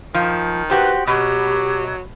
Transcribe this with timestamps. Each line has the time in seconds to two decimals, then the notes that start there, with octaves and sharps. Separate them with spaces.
0.14 D#3 F3
0.70 F#4 G4 B4 C5
1.07 B2 F#3 G4